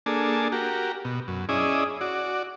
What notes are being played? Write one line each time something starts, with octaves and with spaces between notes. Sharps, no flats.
A#3 D4 G#4 A4
F#4 G4 A#4
B2
F#2
C#4 E4 G#4 D5 D#5
F#4 D5